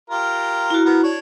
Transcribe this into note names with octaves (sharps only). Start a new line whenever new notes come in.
F4 G4 A#4
E4 F#4
B3 A#4
D4 C#5